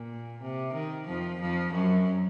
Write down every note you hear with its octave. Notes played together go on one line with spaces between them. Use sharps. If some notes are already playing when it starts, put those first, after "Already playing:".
Already playing: A#2
C3
D#3
F2 F3
F2 F3
F#2 F#3